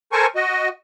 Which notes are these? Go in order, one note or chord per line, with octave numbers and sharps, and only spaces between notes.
A4 A#4 C5 G#5 C#6
F#4 D#5